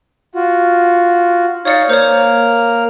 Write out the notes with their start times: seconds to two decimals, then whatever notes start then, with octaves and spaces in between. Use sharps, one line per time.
0.35 F4 F#4
1.65 D#4 C#5 D5 F5 C#6 C#7
1.89 A#3 C5 C#5 F6